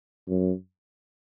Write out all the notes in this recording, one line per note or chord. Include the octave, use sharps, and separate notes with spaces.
F#2